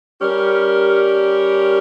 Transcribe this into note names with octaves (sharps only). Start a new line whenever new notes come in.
G3 C#4 G4 A#4